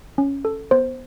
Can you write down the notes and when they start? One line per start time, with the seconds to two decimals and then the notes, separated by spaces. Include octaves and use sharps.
0.18 C#4
0.45 A4
0.71 B3 C5